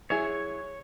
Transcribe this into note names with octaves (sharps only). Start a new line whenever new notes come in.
F#3 E4 G#4 C#5